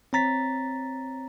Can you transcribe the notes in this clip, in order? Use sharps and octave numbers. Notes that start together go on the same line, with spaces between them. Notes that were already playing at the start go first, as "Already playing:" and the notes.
C4 C#5 A#5 A6 B6